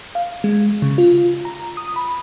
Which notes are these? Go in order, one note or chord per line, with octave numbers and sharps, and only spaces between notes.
F5
G#3
C#3
F4
A#5
D#6
B5